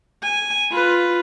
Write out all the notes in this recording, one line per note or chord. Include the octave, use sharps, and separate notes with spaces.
G#5
F4 B4